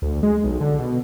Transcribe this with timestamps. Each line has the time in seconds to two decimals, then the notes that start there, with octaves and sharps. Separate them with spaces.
0.02 D2
0.23 G#3
0.44 B1
0.61 D3
0.79 B2